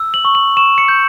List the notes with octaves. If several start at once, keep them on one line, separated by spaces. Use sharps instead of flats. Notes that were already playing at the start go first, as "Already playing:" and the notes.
Already playing: E6
F#7
C#6
F#7
C#6 E7
C#7
G6